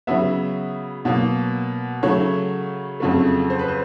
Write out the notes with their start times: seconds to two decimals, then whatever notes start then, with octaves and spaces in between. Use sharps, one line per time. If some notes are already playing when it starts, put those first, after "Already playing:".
0.07 C#3 F#3 B3 E5
1.05 B2 F#3 A#3
2.03 C#3 F#3 A3 C#5
3.00 F2 C#3 F#3 A3
3.50 C5
3.59 B4
3.68 C5